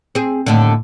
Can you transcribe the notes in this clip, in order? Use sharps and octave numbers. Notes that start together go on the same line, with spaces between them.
C4 G#4
D#2 A2 D3